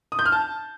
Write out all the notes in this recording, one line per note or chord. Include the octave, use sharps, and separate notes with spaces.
D#6
G6
F6
A5